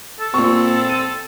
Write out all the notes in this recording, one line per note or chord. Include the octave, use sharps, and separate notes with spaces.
A4
A#2 C4 C#6
D#7